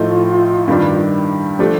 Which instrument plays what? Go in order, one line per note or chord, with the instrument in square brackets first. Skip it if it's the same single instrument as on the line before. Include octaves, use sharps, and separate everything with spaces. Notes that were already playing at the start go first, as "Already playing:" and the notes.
Already playing: [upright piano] A2 F3 A3 D#4 [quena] F4
[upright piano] G2 D#3 G3 D4
[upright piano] F3 A3 D4 [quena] G4